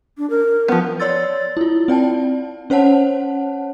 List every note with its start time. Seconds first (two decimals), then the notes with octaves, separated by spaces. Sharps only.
0.18 D4
0.30 A#4
0.68 F3 B3
1.00 C#5 D5 C6 E6 A6
1.57 E4 F4
1.88 C4 D5 G5 A5
2.70 C#4 C5 C#5 F#5 A5